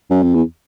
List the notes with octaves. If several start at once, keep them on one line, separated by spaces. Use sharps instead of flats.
F#2
F2
E2